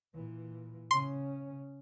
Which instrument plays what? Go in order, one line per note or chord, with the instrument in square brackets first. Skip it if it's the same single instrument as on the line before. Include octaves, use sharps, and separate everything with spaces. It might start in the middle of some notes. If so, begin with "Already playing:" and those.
[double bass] A#2 E3
[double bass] C#3 C#4 [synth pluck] C6